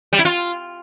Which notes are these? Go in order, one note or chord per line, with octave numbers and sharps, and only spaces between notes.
G3
E4
F4